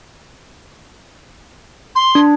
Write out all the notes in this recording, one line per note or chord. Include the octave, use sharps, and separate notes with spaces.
C6
D4